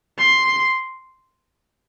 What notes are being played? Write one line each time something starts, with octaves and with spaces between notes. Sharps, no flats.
C6